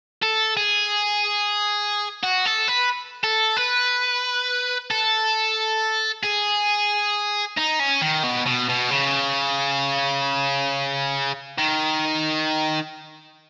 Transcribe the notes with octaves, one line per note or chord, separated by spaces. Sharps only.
A4
G#4
F#4
A4
B4
A4
B4
A4
G#4
D#4
C#4
D#3
B2
B2
B2
C#3
D#3